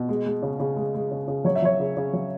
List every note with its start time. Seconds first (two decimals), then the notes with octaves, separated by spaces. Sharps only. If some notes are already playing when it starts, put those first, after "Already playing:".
Already playing: B2
0.09 G#3
0.26 G#3
0.42 C#3
0.60 C#3
0.76 G#3
0.95 G#3
1.11 C#3
1.28 C#3
1.44 F#3 C#5
1.55 E5
1.62 F#3 C#5
1.80 C#3
1.97 C#3
2.13 F#3